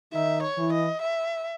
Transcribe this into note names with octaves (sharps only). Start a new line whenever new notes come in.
D#3 D#4 E5
C#5
E3 E4
D#5
E5